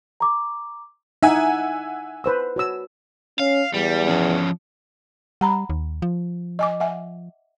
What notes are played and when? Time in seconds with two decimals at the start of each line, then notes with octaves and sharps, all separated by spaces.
0.20 A#5 D6
1.23 D#4 E4 E5 F#5 G#5
2.24 B4 C5 E6
2.56 F#4 C#5 E6
3.39 C#4 F5
3.74 E2 G3
4.08 F3 C#4
5.41 G3 F#5 A#5 B5
5.70 D#2
6.02 F3
6.59 D#5 G#5 D6
6.80 E5 F#5 G#5